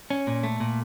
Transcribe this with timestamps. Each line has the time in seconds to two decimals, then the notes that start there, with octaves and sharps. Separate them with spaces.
0.10 C#4
0.27 A#2
0.43 A3
0.60 A#2